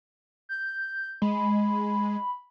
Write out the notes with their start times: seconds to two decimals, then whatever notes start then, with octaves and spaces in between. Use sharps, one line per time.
0.49 G6
1.22 G#3 B5